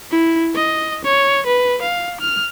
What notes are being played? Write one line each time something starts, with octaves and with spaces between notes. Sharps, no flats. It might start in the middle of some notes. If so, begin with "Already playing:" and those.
E4
D#5
C#5
B4
F5
F6